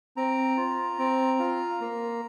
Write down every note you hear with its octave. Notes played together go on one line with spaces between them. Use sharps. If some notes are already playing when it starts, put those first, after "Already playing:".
C4 A#5
F4
C4
F4
A#3